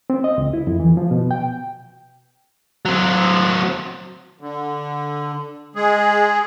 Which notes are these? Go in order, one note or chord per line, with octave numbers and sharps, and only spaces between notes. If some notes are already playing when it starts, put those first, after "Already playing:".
C4
D#5
C#2
E4
F2
E3
F3
B2
G5
F#3 C4
D3
G#3 G#4